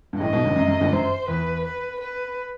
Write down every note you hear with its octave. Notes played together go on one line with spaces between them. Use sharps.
G2
A1 A2 D#5
B1 B2
G1 G2
F#2
F#2
G1 G2
F#2 C5
E2 B4
B4
B4